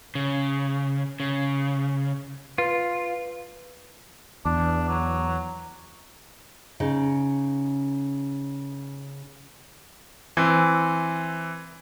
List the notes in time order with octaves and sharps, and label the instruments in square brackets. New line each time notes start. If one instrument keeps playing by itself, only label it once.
[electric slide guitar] C#3
C#3
[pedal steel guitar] F4 [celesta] B4
[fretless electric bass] E2 [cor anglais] D4
[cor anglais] F#3
[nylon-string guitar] C#3 D#4
[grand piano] E3 C4